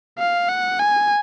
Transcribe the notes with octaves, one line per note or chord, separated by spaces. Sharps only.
F5
F#5
G#5